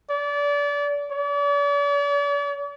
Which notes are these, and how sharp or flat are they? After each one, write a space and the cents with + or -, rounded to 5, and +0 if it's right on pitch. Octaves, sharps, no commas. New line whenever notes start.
D5 -30
D5 -45